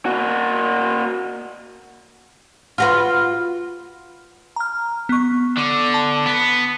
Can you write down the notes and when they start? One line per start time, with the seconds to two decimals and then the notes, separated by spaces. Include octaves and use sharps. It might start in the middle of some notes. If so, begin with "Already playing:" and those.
0.06 A#3 F#4
2.78 F4 F#4 B4
4.56 A#5 F6
5.09 B3 C#6
5.57 D3
5.94 A5
6.26 B3